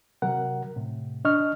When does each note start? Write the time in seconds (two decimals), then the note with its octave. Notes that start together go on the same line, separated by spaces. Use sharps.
0.22 C3 F#3 A#4 F#5
0.76 A2 C3
1.25 D4 D#5 C#6 F6